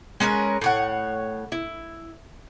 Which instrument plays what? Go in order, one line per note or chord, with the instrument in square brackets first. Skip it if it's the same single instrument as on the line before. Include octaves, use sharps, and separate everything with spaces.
[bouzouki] G#3 C#4 A#4 B4
A2 C#5 F#5
E4